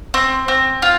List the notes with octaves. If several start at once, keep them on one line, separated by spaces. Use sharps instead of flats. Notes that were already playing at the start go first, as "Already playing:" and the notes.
C4
C4
F4